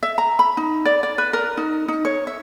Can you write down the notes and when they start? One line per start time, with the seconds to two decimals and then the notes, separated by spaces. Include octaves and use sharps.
0.03 E5
0.18 A#5
0.39 B5
0.57 D#4
0.85 D5
1.03 D5
1.18 B4
1.33 A#4
1.57 D#4
1.88 D#4
2.05 C#5
2.27 E5